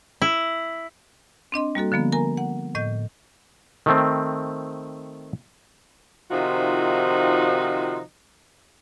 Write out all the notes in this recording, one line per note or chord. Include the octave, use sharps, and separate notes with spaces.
E4
C4 D4 D#5 C6
G3 A#3 F#4 A4
D3 F3 A#3 B3
A#4 G#5 A#5
F#5
A2 D#5 G6
D#3 A3 C4
C3 D#3 F3 D#4 F4 F#4